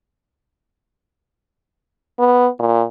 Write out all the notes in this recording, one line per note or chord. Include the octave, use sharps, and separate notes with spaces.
B3
A#2